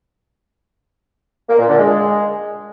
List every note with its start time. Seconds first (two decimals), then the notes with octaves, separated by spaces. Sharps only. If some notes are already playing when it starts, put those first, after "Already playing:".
1.49 A#3
1.59 A#2
1.69 D3
1.79 G#3